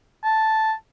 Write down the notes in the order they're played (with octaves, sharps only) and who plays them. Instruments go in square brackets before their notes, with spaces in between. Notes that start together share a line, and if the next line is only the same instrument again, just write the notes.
[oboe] A5